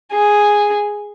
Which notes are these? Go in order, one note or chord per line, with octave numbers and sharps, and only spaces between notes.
G#4